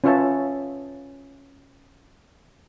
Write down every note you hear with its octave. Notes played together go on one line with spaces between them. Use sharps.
C#4 F4 B4 C#5 E5 A5